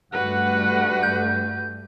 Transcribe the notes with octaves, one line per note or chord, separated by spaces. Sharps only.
G2 G3 A3 F#4 B4 F#5
G6